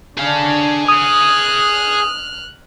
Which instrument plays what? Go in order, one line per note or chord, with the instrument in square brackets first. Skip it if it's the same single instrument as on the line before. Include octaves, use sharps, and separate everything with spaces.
[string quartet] D3 D4 [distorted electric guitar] G#4 F5
[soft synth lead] D#6 [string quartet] F6 F#6